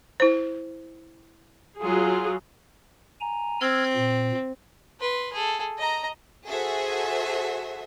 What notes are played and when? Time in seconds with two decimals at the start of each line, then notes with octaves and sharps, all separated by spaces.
0.20 E4 C5
1.79 F#3 F4 G#4
3.21 G#5 A#5
3.61 C4 E6 F6 G#6
3.96 A#2
5.00 B4 C6
5.33 G#4 A4
5.78 D#5 A#5
6.47 F#4 G#4 A4 C5 E5